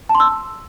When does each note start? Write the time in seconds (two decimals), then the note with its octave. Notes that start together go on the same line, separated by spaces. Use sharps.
0.09 A5
0.15 C6
0.20 E6